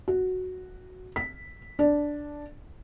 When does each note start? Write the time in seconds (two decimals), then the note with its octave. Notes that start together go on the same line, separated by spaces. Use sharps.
0.08 F#4
1.16 B6
1.79 D4